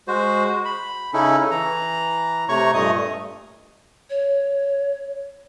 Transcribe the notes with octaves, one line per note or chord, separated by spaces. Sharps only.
G#3 F#4 C5
B5
C#3 C#4 D#4 E4 A4
E3 A#5
C3 A3 C#5 A#5 C#6
G2 A#2 A3 D#5 D#6
C#5